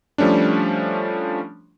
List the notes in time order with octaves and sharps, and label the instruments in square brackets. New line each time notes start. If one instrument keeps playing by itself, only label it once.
[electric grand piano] F3 G3 A3 C#4 D4